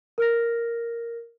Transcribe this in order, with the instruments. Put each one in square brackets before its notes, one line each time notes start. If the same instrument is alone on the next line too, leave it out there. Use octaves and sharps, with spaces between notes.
[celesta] A#4 F6 A#6